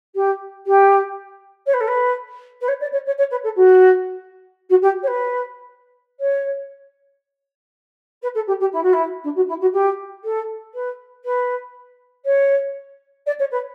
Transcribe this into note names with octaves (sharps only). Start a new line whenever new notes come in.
G4
G4
C#5
B4
A4
B4
B4
C#5
D5
C#5
C#5
C#5
B4
A4
F#4
F#4
G4
C#5
B4
C#5
B4
A4
G4
G4
E4
F#4
E4
D4
F#4
E4
F#4
G4
A4
B4
B4
C#5
D5
C#5
B4